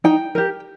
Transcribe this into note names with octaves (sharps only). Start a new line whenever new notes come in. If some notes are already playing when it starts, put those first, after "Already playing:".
D#4 G5
G4 A#4